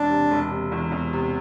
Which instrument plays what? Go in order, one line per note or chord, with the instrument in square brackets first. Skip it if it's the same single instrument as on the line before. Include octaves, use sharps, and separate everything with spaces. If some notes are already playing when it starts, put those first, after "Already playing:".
Already playing: [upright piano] E1 [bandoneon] D4
[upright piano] C3
E1
C3
E2
E2
C3